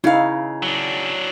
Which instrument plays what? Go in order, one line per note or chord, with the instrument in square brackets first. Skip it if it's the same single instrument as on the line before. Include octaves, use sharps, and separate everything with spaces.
[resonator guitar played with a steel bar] C#3 F5 [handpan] D#4 E4
[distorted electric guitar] F#3 D4